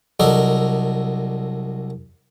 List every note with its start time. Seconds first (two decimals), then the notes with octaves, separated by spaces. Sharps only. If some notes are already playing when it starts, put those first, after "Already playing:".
0.20 C2 F#3 A4 A#4 D5 D#5